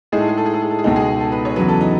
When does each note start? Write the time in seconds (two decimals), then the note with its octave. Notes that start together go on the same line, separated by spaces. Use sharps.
0.12 A2 G#3 D#4 G#4
0.20 A4
0.29 G#4
0.38 A4
0.46 G#4
0.54 A4
0.62 G#4
0.70 A4
0.79 G#4
0.84 C#2 B2 G#3 D#4 A4
0.96 G#4
1.20 A4
1.32 B4
1.45 C#5
1.56 E2 C#3 F#3 B4
1.68 A4
1.81 D#4